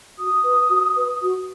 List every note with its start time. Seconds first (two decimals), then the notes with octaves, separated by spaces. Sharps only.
0.18 F#4 D#6
0.44 B4
0.70 F#4
0.96 B4
1.22 F#4